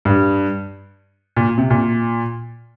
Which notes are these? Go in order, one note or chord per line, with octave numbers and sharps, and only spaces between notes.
G2
A#2
C3
A#2